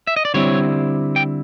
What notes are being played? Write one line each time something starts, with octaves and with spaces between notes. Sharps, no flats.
E5
D#5
D5
D3 G3 C4 E4 C#5
G5